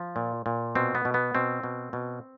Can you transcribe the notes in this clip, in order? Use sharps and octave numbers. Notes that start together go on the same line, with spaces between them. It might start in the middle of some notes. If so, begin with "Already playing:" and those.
Already playing: F3
A#2
A#2
B2 C4
B3
B2
B3
B2 C4
B2
B2